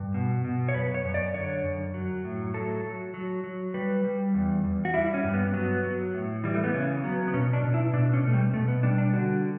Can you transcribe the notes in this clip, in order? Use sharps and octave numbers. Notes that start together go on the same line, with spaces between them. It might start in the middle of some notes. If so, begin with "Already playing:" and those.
Already playing: G2
B2
B2
C#5
F#2 B4
C#5
F#2
D5
D3 C#5
F#2
F#3
A2
F#3 A4
F#3
F#3
F#3
G3 B4
G3
E2
E2
F#4
G3 E4
C#4
G2
B3
F#3 B3
F#3
A2
E3 G3
A3
B3
C#3 C#4
F#3 B3
B3
B2 C#4
D4
B2
E4
B2 D4
C#4
B2 A3
G3
B2 A3
B3
G3 D4
D4
D3 F#4